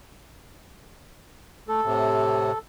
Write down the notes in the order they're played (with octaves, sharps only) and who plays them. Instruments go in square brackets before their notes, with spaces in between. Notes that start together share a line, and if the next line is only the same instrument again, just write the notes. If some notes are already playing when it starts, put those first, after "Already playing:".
[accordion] A3 [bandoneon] A4
[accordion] A2 C3